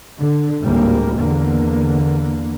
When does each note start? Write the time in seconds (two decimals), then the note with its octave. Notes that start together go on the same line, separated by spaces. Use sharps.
0.20 D3
0.62 G#1 D2 A2 G3 G#3 A#3
1.16 E2 D3 A#3